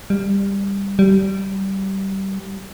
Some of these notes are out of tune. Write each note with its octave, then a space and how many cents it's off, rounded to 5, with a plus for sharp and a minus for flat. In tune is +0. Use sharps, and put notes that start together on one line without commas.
G3 +15
G3 -20